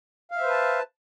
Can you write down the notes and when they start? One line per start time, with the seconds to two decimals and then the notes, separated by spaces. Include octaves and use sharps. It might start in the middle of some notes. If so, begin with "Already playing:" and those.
0.32 F5
0.36 E5
0.41 C5
0.46 B4
0.51 A5